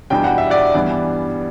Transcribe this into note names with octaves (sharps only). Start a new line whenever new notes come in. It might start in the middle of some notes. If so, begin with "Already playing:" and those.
E2 B2 G3 D4 G5
F#5
E5
D5 F#5
G2 E3 G3 B3 D4